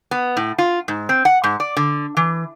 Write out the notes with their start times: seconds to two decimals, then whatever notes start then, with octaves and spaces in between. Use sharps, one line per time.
0.11 B3
0.37 A2
0.58 F4
0.88 G#2
1.09 C4
1.25 F#5
1.44 G#2
1.60 D5
1.77 D3
2.17 E3